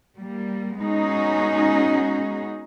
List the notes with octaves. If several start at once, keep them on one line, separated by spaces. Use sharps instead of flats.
G3 A#3
G#3 B3 C#4 D#4 F#4 G#4